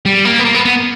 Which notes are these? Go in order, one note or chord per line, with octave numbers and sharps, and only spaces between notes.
G3
A#3
B3
A#3
B3
B3